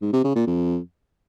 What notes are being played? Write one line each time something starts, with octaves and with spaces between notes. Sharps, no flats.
G#2
C3
C#3
A#2
F2